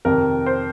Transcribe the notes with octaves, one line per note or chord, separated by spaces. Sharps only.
F2 C3 D#3 A#4
C5